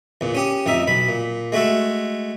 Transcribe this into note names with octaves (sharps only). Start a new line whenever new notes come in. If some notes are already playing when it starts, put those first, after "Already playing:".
E2 A#2
C#4 G4 D#6
A1 F2 D#4 E5
B1 B5
A#2
G#3 A3 F#4 A4